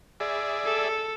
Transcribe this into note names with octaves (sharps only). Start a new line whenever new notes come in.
G#4 D5 E5
A4